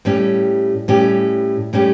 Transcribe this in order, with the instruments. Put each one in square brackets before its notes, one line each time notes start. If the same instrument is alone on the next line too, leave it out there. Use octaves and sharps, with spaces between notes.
[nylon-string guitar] A2 G3 C#4 G4
A2 G3 C#4 G4
A2 G3 C#4 G4